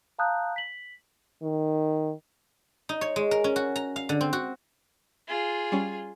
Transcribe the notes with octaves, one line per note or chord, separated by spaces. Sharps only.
F5 A5 A#5 D#6 F#6 G6
B6 F#7
D#3
D#4
C#5
G#3
A#4
C#4
F#4
A#5
F5
D3
C4
F#4
F4 G#4
G3 C#4